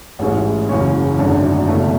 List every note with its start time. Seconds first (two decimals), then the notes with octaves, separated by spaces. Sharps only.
0.19 A1 G#2 G#3 C#4 E4
0.69 F#1 F#2 E3 G#3 C#4
1.18 G#1 F#2 D3 A3
1.67 F#1 E2 B2 A3 C#4